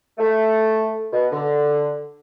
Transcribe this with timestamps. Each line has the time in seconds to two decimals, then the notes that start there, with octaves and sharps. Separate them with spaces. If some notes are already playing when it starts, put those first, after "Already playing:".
0.18 A3
1.11 B2
1.31 D3